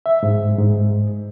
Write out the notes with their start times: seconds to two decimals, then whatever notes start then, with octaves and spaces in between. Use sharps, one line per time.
0.06 E5
0.23 G#2
0.59 G#2